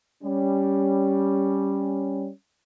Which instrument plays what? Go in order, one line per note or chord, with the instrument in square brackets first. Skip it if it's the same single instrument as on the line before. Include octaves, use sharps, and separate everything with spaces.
[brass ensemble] G3 C#4